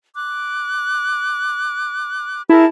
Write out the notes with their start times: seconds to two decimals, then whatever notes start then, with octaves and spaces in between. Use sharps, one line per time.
0.15 D6 F#6
2.49 E4 G#4 A#4 A5